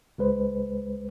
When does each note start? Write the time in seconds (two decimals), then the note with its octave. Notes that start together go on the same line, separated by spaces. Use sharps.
0.18 C#2 G#3 B4 C5